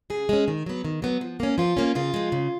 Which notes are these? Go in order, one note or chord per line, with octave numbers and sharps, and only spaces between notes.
C#3 G#4
G#3 C#4
D#3
F#3 B3
D#3
F#3 B3
F3
A#3 C#4
F3 F4
A#3 C#4
C#3 F4
F3 G#3
C#3